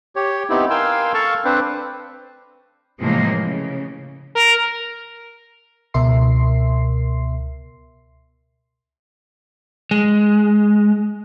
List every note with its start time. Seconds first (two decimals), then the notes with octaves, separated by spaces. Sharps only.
0.16 G4 C#5
0.50 B3 C4 D#4 E4 G4
0.70 A#4 F5 G5 G#5 C6 E6
1.14 A4 F5 A5 C#6
1.45 C4 D4 B4 C5
3.00 A2 C3 E3 F3 G#3 A#3
3.45 C#3
4.35 A#4
5.94 C#2 B2 A#4 E5 C6 C7
9.91 G#3